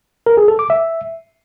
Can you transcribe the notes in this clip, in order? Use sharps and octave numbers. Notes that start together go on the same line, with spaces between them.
A#4
G#4
A4
D6
E5